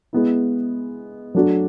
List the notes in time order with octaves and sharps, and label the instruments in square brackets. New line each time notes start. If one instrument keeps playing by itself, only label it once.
[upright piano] G#3 B3 E4
F#3 A3 D4 F#4